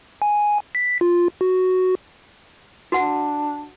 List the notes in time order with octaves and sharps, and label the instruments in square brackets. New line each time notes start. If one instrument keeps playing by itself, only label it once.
[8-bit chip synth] G#5
B6
F4
F#4
[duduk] D4 [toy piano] F#4 F#5